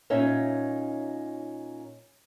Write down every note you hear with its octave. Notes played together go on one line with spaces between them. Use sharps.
A#2 C#4 D#4 C#5 D#5 E5